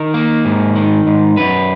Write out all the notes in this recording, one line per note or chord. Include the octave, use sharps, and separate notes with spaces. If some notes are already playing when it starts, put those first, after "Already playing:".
Already playing: D#3 A#4
A#3
G#2
D#3
G#2
F#2 B4